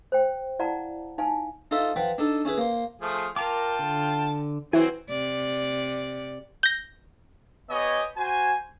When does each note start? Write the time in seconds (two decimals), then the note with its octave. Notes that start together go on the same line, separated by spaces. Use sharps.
0.12 C5 G5
0.59 E4 D5 F5 F#5 A5 A#5
1.18 D#4 F5 G#5 A5
1.71 D#4 F4 A4 C5 D#5 E5
1.96 F3 B4 F#5 G5 B5
2.18 D4 D#4 A4
2.45 C#4 E4 G#4 B4
2.58 A#3 C5
3.02 F3 A3 G#4
3.36 F4 A#4 G5 A5 A#5 D6
3.79 D3
4.73 E3 F#3 C4 F#4 G#5
5.09 C3 D5
6.63 G6 A#6
7.70 B3 G4 C#5 D#5 G#5
8.17 F#4 C5 G#5